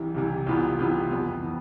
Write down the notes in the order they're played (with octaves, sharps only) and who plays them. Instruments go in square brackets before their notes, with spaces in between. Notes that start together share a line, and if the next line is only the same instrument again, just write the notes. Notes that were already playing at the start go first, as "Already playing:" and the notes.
Already playing: [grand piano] C2 C3 E3
C2 C3 E3
C2 C3 E3 B3 F4
C2 C3 E3 B3 F4
F2 E3 B3
E3 B3